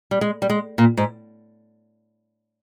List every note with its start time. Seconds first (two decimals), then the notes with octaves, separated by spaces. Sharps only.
0.11 G3
0.21 G#3
0.42 G3
0.50 G#3
0.78 A#2
0.97 G#2